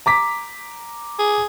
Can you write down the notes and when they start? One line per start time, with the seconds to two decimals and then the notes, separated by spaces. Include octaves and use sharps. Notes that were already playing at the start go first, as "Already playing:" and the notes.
0.06 A#5 D6 B6
1.19 G#4